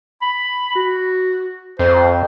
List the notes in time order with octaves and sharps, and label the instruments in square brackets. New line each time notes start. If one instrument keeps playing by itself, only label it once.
[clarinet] B5
F#4
[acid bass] F2 [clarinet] C5